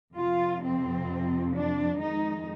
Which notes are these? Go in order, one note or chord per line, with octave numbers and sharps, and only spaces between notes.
F2 C3 F3 F4
C4
D4
F2 D#3 G#3 D#4